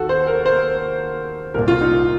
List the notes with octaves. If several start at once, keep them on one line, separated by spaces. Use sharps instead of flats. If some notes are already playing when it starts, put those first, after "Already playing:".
Already playing: D#2 D#3 F#4 A4
C5
A#4
C5
C2 A#2 A#4
F4
D#4